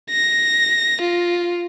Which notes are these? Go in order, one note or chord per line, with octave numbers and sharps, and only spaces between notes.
A#6
F4